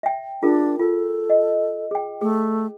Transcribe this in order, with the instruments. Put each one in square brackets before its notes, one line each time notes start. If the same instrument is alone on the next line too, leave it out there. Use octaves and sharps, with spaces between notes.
[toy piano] E5 G5
[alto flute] D4 [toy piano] F4 G#4 A#4
[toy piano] F4 [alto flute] A4
[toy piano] D#5
G#4 G5
[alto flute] A3 [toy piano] G#4